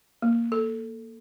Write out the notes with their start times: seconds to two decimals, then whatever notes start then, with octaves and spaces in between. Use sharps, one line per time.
0.22 A#3
0.52 A4